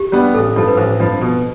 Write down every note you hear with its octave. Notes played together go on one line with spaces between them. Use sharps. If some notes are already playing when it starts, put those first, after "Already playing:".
Already playing: G4
G3 B3 D4
A1 A4
G2 F3 A4
B4
A1 C5
G2 F3
B2